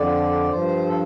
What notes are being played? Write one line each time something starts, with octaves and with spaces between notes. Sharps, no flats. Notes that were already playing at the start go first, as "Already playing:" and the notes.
Already playing: F2 D3 F3 D5
G2 F3 C5
A4